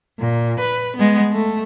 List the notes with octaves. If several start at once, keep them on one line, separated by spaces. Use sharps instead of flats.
A#2
B4
G#3 B3
A3